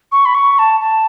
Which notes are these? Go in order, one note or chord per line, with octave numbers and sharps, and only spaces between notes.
C#6
B5
C#6
A5
A5